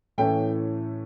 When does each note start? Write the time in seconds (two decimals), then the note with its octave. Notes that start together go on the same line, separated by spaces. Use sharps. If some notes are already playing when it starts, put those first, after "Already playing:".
0.18 A2 E3 A3 C#4 G5